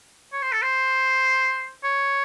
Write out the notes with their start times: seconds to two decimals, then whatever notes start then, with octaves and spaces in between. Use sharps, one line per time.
0.32 C#5
0.42 C5
0.52 A4
0.62 C5
1.83 C#5